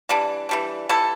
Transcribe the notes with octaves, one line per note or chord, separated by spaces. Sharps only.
E3 G3 D4
E3 G3 D4
E3 G3 E4 A4